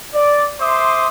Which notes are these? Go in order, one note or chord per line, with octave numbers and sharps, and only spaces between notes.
D5
C5 E5 C6 D6 D#6